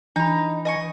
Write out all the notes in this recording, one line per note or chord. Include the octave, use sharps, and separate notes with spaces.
E3 D4 D#4 B5
D#5 G#5 C#6